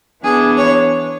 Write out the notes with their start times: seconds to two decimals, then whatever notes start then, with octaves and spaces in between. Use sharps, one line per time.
0.24 E3 B3 D4 G#4
0.57 C#5